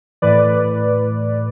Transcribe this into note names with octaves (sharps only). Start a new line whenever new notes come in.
A2 E3 B4 D5